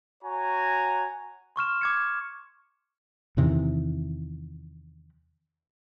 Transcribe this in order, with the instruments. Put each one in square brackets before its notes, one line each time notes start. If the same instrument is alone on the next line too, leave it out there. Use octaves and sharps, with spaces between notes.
[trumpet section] F#4 C#5 G#5 A#5
[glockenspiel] C6 C#6 F6 E7
D6 G#6 C#7
[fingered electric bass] E2 C3 D#3 E3